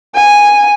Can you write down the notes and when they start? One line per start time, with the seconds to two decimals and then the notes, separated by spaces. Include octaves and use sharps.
0.15 G#5